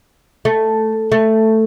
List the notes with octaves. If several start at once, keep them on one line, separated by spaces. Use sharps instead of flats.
A3
A3